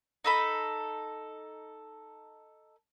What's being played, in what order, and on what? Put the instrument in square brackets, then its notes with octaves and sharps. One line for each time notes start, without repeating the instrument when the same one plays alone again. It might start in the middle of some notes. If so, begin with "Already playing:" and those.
[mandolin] D#4 A4 B5